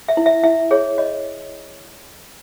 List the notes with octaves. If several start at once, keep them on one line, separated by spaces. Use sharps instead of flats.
E5
E4
E5
E4 E5
G#4 C#5
C#5 D#5